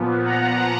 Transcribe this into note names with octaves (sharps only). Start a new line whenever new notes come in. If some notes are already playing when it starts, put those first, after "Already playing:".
Already playing: A#2 F3 B3
F#5 A#5